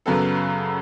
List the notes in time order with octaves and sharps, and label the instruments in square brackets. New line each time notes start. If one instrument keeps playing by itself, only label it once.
[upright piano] F#2 C#3 F#3 B3 A4